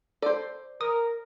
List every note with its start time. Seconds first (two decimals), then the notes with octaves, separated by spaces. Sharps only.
0.22 A4 C5 D5
0.81 A#4 D#6